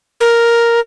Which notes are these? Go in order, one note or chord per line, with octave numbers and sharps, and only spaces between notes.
A#4